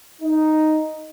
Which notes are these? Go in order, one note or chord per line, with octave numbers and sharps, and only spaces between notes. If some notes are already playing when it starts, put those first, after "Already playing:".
D#4